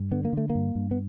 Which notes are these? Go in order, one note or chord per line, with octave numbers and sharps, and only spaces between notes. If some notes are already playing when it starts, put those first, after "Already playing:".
Already playing: G2
D3 B3
A#3
D3 A3
A#3
G2
G2
B3